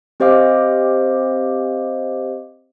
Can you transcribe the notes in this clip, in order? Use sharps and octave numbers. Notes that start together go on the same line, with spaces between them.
C4 G4 C5 D#5 F5 D6